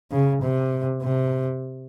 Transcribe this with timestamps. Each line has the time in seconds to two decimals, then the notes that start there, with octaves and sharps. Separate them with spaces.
0.11 C#3
0.42 C3
1.02 C3